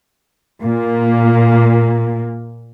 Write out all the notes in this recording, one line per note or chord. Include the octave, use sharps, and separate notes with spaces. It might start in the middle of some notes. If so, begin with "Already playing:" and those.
A#2 A#3